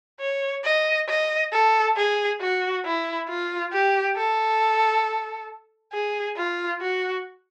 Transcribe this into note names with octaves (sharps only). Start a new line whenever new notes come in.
C#5
D#5
D#5
A4
G#4
F#4
E4
F4
G4
A4
G#4
F4
F#4